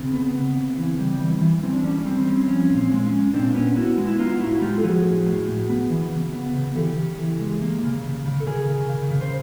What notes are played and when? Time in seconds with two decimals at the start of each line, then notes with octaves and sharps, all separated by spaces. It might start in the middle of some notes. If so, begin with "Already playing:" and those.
Already playing: C#3 C4
0.13 B3
0.35 B3
0.57 C#3
0.77 E3
0.99 G3
1.20 E3
1.41 E3
1.62 E3 C4
1.73 D4
1.84 G3 C#4
1.99 C#4
2.05 G3 C4
2.27 C4 C#4
2.48 F3 C#4
2.70 A#2
2.77 C4
2.91 G#3
3.06 C#4
3.12 G#3
3.34 A#2 C4 D4
3.55 B3 C#4
3.76 B3 E4 F#4
3.98 G#3
4.07 E4
4.19 B3 D#4 F4
4.40 A2 E4 F#4
4.62 G#3 F4 G4
4.77 A4
4.84 F3 F#4 G#4
5.05 A2
5.27 A2
5.47 A2
5.70 B3
5.90 E3
6.12 C#3
6.32 B3
6.54 C#3
6.75 E3 G4 A4
6.97 C#3
7.19 E3
7.40 G#3
7.62 A#3
7.83 C#3
8.04 C#3
8.26 C#3
8.40 A4
8.46 C#3 G#4 A#4
8.69 C#3
8.89 C#3
9.10 C#3
9.21 C5